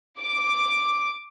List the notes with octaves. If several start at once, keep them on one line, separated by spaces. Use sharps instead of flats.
D6